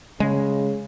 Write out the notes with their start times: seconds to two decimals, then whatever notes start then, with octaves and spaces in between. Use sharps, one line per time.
0.20 C#3 G#3